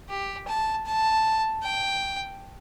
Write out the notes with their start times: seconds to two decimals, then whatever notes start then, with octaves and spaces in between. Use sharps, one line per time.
0.09 G4
0.48 A5
0.86 A5
1.64 G5